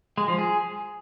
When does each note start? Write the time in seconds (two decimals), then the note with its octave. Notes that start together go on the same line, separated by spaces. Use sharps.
0.18 G#3
0.28 F3
0.39 G#4